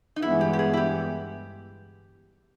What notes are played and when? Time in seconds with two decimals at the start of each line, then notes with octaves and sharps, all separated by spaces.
0.16 D#4
0.22 G1 G2 E3 G#3 B3 E4
0.41 G4
0.53 G4
0.59 G#4
0.73 E4
0.77 G4